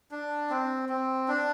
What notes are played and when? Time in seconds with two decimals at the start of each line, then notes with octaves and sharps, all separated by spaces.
0.11 D4
0.50 C4
0.89 C4
1.28 D4